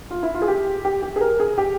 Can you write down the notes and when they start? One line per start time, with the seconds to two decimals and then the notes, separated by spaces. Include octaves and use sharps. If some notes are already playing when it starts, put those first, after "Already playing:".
0.11 F4
0.23 E4
0.35 F4
0.42 G#4
0.48 G4
0.85 G4
1.02 G4
1.16 G#4
1.21 A#4
1.40 G#4
1.58 G4